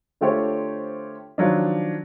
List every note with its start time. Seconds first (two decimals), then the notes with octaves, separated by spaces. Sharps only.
0.21 D3 A3 F4 G4 C5 C#5
1.38 D#3 F3 F#3 D4